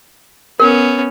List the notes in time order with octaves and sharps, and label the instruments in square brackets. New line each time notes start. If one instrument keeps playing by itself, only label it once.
[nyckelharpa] B3 C#4 [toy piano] A#4